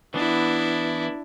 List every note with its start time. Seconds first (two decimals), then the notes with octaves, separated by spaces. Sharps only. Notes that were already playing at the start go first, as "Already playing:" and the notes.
0.14 E3 B3 D4 E4